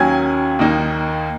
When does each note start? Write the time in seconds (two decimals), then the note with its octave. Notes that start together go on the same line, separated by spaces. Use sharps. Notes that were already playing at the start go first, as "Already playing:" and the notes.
Already playing: D#2 D#3 F#3 C#4 G#5 G#6
0.59 D#2 D#3 A#3 D#4